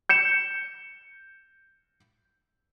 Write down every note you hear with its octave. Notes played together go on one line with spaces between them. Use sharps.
G6 C#7 E7